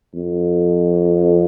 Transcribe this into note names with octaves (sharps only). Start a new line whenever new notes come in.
F2